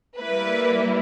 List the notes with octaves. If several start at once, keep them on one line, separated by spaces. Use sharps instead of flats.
G3 A#3 E4 B4